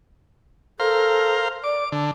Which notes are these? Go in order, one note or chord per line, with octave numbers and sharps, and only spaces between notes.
A4 A#4 C5 F5
D5 D6
D3 A5